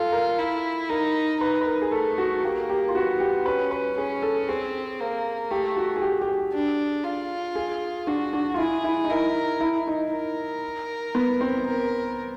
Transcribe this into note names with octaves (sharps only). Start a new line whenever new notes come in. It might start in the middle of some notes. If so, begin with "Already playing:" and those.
Already playing: F4 A4
A#4
E4
D#4 A#4
D#4 B4
B4
A#4
G#4
A3 A4
F#4
A#3 G4
G4
F4
B3 F#4
G4
C#4 B4
B4
C#4 G#4
A4
C4 G#4
A#3
A3 G4
F#4
G#4
G4
G4
G#4
D4
F4
G#4
D4 F#4
D4
F4
E4 G#4
E4
D#4
E4 A#4
E4
D#4
A#4
B3
C4
A#4